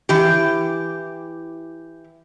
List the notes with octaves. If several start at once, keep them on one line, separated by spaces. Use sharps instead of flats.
E3 G4